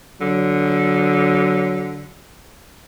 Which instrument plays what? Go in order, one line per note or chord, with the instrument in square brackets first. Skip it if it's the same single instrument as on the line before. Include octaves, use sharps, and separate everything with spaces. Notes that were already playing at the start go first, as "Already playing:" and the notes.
[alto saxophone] D3 [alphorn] F#3